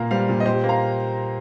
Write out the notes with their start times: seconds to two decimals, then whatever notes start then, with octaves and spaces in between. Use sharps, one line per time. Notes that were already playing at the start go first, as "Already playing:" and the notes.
Already playing: A#2 A#3 F5 A#5
0.11 G3 C5 F5
0.29 A#2
0.40 D#5
0.45 A#2 G4 C5
0.64 A#3
0.69 F5 A#5